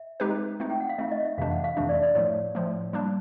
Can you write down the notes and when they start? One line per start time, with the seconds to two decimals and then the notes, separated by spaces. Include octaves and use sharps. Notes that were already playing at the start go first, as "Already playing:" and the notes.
Already playing: E5
0.20 G#3 C4 D#4 G4 B4
0.60 A3 C4 D#4
0.70 G5
0.80 F#5
0.89 F5
0.98 A3 C4 D#4 E5
1.11 D#5
1.25 E5
1.38 F2 C3 E3 A3 D4 F5
1.51 F#5
1.64 F5
1.77 F2 C3 E3 A3 D4 E5
1.89 D5
2.03 D5
2.15 A2 F3 A3 C#5
2.55 A2 F3 A3
2.93 G3 A#3 D4